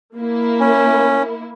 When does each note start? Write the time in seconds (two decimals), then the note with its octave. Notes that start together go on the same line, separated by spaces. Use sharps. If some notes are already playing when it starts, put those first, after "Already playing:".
0.16 A#3 E4
0.60 C#4